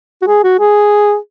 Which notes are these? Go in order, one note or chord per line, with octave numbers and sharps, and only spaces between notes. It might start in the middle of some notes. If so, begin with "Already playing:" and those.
F#4
G#4
F#4
G#4